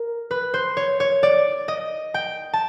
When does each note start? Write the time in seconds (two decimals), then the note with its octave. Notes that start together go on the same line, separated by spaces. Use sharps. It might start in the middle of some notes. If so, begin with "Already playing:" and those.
Already playing: A#4
0.31 B4
0.54 C5
0.77 C#5
1.00 C#5
1.23 D5
1.68 D#5
2.14 G5
2.53 A5